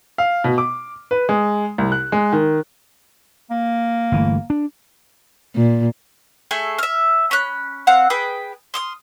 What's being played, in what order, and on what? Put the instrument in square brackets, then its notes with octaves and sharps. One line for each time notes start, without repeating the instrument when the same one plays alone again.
[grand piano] F5
B2
D6
B4
G#3
C2
F#6
G#3
D#3
[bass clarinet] A#3
[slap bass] G1 E3 A3
D4
[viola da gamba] A#2
[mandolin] A3 G#4 A4 G#5
E5 F6
C#4 B5 F#6
C4 F5 F#5
G#4 B4 G5 D#6
C6 D#6 F6